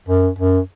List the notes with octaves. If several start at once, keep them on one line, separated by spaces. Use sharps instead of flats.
F#2
F#2